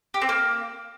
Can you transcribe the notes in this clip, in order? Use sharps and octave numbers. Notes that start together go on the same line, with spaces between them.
G4
C4
A#3